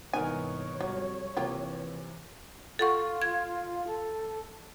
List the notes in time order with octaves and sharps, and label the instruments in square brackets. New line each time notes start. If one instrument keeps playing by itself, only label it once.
[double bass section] C2 G#2 E3 [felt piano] B3 D#4 A#4 [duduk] C#5 [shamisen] G#5
[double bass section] F2 G3 [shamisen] F#3
[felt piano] C3 [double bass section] E3 [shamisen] A#3 F4 G4
[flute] F4 [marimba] A4 F#5 C#6
[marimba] G#6
[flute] A4